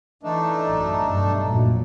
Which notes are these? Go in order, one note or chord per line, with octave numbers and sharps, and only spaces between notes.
E3 A3 D4 D#4
A1 F#2
B1 G2
F1 A#2 F#3